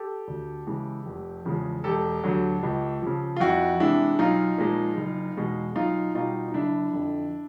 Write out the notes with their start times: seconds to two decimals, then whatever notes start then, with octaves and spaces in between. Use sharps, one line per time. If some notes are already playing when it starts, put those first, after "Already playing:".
Already playing: G4 A4
0.28 D2
0.67 C#3 E3 G#3
1.06 F1
1.45 E2 C#3 F3 G#3
1.84 E1 G4 A4
2.24 D2 D3 F#3
2.63 C#2
3.02 C#3 F3
3.36 F4
3.40 F2 E4 F#4
3.80 C3 E3 G#3 D4 E4
4.19 B1 D#4 F4
4.58 A#2 F3 G#3
4.97 F#1
5.37 E2 B2 G#3
5.76 B1 D#4 F4
6.15 B2 G3 D#4 F4
6.48 D#4
6.54 F#1 D4 E4
6.93 F2 D3